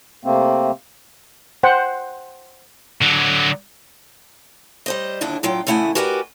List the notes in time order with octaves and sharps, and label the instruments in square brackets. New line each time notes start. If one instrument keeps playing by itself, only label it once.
[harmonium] C3 A3 A#3 C4
[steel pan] C5 F#5 G5
[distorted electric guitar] D3 F#3
[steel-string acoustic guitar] G3 C5 D#5
D#2 A#2 D3 D4 E4
A2 F#3 F4 G5
E2 C#3 A3 E4 F#5 G#5
F#4 G4 A#4 B4 D5 G#5